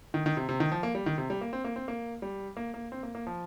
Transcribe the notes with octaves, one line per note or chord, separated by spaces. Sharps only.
D#3
D#3
C3
C3
D#3
F3
A#3
G3
D#3
C3
G3
A#3
C4
A#3
C4
A#3
G3
A#3
A#3
C4
A#3
A#3
F3